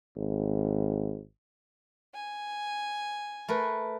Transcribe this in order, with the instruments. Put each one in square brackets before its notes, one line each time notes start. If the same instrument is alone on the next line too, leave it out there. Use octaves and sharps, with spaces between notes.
[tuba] G#1
[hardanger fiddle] G#5
[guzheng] A3 A#4 B4